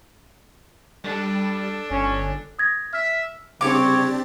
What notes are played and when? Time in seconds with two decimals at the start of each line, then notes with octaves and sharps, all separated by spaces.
1.04 G3 D4 A4
1.90 G1 C#4
2.59 D#6 G#6 A#6
2.93 E5 F6
3.61 C2 C#3 C4 D4 G4 C#5 D6 A6